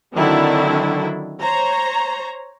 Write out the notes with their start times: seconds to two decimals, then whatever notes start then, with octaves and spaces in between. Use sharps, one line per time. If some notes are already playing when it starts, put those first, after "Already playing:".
0.16 D3 D#3 F#3 C4 D4 E4
1.40 C5 C#5 A#5